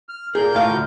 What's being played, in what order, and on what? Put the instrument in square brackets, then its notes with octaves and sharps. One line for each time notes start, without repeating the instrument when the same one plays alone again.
[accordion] F6
[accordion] A#2 A#4 G6 [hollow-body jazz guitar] G#4
[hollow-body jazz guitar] A2 F5
D2